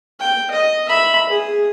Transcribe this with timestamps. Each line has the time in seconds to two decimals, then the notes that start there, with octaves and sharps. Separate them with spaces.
0.20 G5
0.51 D#5
0.89 E5 B5
1.29 G#4